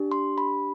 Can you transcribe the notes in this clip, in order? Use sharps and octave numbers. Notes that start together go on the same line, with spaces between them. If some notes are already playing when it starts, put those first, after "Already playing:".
Already playing: D4 G4
C6
B5